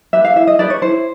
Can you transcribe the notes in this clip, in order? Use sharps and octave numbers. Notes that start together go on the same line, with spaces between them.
G4 B4 E5
F5
E4 E5
D#5
G4 B4 D5
C#5
E4 C5